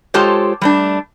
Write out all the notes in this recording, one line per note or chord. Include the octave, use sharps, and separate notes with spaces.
G#3 F4 G4 A4 C5 C#5
G3 A3 D4